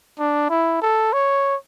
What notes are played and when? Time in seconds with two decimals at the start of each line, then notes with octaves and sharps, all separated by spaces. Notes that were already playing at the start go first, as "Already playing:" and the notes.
0.19 D4
0.50 E4
0.82 A4
1.13 C#5